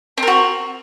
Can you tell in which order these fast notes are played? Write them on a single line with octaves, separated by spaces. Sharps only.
C4 A#4 F#4